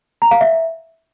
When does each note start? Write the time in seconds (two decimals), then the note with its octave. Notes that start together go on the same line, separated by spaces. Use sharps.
0.22 A#5
0.31 F5
0.41 E5